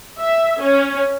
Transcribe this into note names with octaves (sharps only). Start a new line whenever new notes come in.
E5
C#4